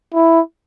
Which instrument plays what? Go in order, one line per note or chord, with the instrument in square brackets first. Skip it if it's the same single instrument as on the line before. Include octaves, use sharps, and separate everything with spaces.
[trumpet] E4